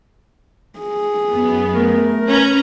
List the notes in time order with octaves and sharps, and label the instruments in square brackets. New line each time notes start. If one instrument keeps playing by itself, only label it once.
[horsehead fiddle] G#4
[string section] F#2 B3
[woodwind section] A3 A#4
[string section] C#4 B4 A#5